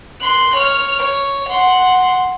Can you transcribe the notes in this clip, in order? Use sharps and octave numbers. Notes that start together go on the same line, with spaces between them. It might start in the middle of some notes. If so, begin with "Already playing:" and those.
C6 F#6
C#5 F6
C#5
F#5 C6